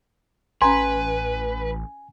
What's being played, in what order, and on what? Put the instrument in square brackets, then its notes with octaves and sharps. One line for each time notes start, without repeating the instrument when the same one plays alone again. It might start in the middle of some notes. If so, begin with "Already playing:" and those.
[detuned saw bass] A1 [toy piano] C#4 A#5 C6 [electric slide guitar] B4 [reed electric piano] G#5